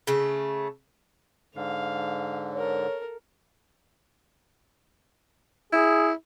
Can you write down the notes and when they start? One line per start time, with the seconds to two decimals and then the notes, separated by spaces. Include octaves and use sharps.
0.07 C#3 A3
1.55 G#2 D3 F5
2.54 A4 A#4 C#5
5.72 E4 G#4